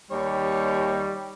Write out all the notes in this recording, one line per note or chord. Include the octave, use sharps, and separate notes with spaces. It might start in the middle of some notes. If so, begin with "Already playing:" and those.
D#2 G3 D#4 C#5